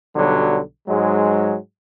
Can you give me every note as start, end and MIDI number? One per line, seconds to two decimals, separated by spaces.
0.15 0.59 35
0.15 0.59 50
0.15 0.59 54
0.15 0.59 55
0.87 1.56 44
0.87 1.56 54
0.87 1.56 56